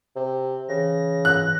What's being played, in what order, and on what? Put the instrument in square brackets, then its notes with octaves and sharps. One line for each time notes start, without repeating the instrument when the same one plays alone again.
[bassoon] C3
[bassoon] C#3 [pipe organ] E3 A#6
[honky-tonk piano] F#6